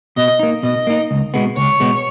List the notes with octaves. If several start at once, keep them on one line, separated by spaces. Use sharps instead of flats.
B2 D#5
A#3 D#4
B2 D#5
A#3 D#4
C#2
B2 G#3 B3
C#2 C#5
B2 G#3 B3